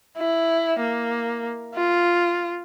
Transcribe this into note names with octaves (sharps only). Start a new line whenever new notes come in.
E4
A#3
F4